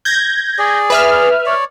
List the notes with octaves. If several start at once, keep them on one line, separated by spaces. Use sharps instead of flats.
G6 G#6 A#6
G#4 D5
B4 E5 F6
C#5 D5